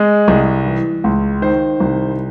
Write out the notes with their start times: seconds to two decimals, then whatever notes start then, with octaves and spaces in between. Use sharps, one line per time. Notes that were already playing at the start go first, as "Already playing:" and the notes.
Already playing: G#3
0.28 C2
0.66 E3
1.04 C#2
1.42 D#3 C5
1.80 C2